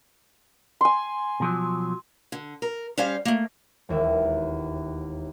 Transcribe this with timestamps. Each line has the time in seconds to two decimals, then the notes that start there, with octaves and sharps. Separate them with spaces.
0.81 G#5 C6
1.40 B2 F3 F#3
2.32 D3
2.62 A#4
2.98 G3 C#4 C5 C#5 F5
3.25 A3 A#3
3.89 E1 D#2 E5